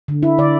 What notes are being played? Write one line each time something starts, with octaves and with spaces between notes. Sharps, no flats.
D3
E4
D3 D5